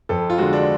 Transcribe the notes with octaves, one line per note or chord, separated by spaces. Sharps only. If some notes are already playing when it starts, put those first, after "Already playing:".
F2 A4
F4
D3 G#3 F#4
D4